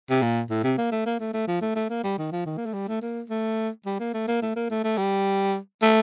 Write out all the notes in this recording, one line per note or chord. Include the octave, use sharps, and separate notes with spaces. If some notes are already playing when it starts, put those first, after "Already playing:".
C3
A#2
A2
C3
A#3
A3
A#3
A3
A3
F3
A3
A3
A#3
G3
D#3
F3
D#3
A#3
A3
G3
A3
A#3
A3
G3
A#3
A3
A#3
A3
A#3
A3
A3
G3
A3